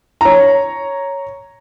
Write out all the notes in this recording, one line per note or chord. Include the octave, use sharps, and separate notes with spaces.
C#5 A#5